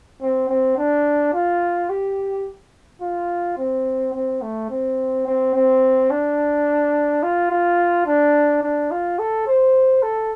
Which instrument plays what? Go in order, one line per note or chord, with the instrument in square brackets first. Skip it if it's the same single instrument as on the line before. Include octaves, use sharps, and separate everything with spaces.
[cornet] C4
C4
D4
F4
G4
F4
C4
C4
A3
C4
C4
C4
D4
F4
F4
D4
D4
F4
A4
C5
A4